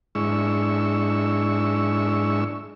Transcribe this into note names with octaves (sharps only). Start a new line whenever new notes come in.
G#2 G#3 D4 E4 C#6 E6